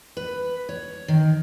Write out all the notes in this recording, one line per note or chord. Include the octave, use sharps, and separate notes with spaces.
B4
C#5
D#3